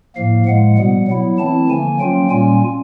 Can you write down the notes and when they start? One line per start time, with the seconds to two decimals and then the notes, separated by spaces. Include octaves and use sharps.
0.16 A2 F3 A#3 F5
0.46 A2 F3 G#3 F#5
0.77 B2 G3 B3 F#5
1.08 F#3 B3 E4
1.38 E3 A3 C4 E4 A5
1.69 D3 F3 A#3 G#5
2.00 F#3 A#3 C#4 F4 G5
2.30 A#2 G3 A#3 C#4 F4 G#5